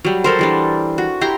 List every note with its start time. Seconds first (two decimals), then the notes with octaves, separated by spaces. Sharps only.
0.05 F#3 G3
0.24 A4 A#4 C5
0.39 E3 G3 D4
0.98 F#4
1.21 E4 G4 A#5 C6